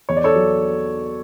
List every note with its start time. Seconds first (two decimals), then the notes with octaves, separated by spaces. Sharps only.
0.09 E2 C#5
0.17 D5
0.24 A4 C#5
0.36 F#3